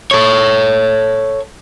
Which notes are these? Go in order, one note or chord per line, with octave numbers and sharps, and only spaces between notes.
A4 C#5